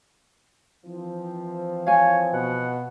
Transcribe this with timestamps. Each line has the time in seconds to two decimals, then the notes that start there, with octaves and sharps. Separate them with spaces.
0.85 E3 F3 C4
1.87 C#5 F5 G#5
2.33 B2 F#5